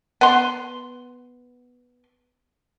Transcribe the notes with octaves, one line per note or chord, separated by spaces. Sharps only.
B3 C6